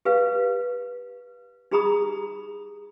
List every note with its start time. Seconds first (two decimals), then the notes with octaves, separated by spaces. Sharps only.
0.05 G4 B4 F5
1.71 D#4 G4 G#4 A#5 B5 D#6